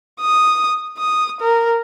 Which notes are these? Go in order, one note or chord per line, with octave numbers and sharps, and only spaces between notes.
D#6
D#6
A#4